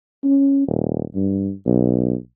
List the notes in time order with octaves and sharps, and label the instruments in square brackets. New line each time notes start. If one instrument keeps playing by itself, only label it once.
[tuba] C#4
D#1
G2
B1